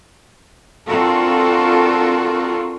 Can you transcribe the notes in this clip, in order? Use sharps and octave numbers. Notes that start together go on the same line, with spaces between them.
C4 D4 F4 F#4 A4 A#4